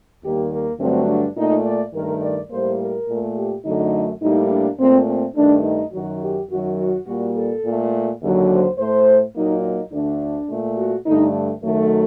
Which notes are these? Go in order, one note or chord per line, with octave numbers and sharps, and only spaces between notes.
D#2 D#3 G3 A#3 G4
A#3
G2 D3 F#3 A3 C4
D4
A#2 A3 D#4
D5
G2 D#3 A3 A#4
D5
A2 G3 A#3 C5
A#4
A#2 A3
G4
F#2 D3 F#3 A3 D#4
A2 G3 A#3 D#4
D4
A#2 A3 C4
C4
G2 D#3 A3 D4
D#4
F#2 D#3 F#3 F#4
G4
F#2 D#3 F#3 F#4
F#4
A#2 G3 A#3 F#4
A4
A#2 A3
D#2 D3 F#3
C5
A2 A3 C5
A#2 F#3 A#3 D#4
D#4
D2 D3 A3 D4
A#2 A3
F#4
G2 D3 A3 D#4
F#2 D#3 F#3 A3